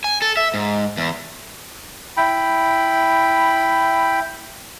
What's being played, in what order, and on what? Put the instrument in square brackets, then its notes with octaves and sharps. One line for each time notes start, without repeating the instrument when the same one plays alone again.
[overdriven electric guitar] G#5
A4
E5
G#2
E2
[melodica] E4 G5 B5